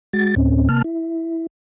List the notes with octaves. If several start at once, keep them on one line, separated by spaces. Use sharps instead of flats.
G#3 F#4 A6
D2 A2 C4 C#4
C3 A#3 A5 F6
E4